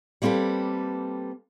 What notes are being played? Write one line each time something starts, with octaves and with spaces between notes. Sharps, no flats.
G3 A#3 C4 A4 B4